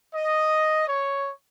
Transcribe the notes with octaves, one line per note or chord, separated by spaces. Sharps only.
D#5
C#5